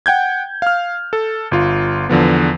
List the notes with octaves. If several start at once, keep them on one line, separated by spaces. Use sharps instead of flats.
F#5 G5 G6 G#6
F5 F6
A4
G1 F4
E2 D3 F3 B3